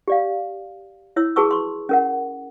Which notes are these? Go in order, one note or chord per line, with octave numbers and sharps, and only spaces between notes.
G4 D5 F5
E4 C#5 E6
F#4 G#4 B4 A5 C#6 E6
C6 C#6
C#4 A#4 F#5